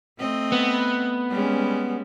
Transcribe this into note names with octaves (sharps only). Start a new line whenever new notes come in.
A3 C4 D#5
B3
G3 G#3 C#4